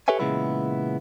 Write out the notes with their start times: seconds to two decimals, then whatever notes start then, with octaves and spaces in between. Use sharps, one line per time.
0.08 G4 A4 B4 C#5 E5 G#5
0.19 A#2 C#3 E3 G#3 B3 E4